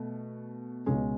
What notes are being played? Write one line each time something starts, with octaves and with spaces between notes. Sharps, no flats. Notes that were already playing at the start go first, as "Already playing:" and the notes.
Already playing: B2 A3
C#2 B2 G#3 C#4